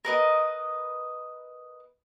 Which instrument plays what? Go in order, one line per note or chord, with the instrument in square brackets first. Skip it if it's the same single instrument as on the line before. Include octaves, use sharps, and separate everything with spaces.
[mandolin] A#4 B4 D#5